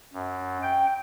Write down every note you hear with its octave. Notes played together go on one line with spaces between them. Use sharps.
F#2
G5